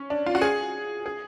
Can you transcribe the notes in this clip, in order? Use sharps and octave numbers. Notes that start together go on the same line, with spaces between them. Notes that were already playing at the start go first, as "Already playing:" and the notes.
Already playing: C#4
D4
F4
F#4
G#4
G#4